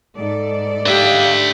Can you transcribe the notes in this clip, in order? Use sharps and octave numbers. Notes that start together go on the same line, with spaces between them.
G#2 A4 D5
B2 F3 D4 F4 G4 E5